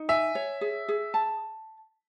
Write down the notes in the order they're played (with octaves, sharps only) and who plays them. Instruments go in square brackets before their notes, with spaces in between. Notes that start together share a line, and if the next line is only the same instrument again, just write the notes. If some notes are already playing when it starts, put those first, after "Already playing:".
Already playing: [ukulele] D#4
[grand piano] E5 [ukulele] G#5
[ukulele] C#5
G#4
G#4
A5